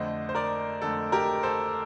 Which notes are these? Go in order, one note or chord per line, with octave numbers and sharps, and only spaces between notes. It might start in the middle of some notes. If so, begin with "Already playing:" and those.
Already playing: F2 D3 A3 C5 D#5
C5
A#4 D5
F2 D3 A3 A4
G4 A#4
A4 C5